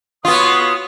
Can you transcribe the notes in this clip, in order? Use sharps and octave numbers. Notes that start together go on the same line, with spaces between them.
B3 F4 F#4 C#5 F5 D#6